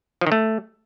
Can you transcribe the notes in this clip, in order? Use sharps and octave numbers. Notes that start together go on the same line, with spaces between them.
F3
D#3
A3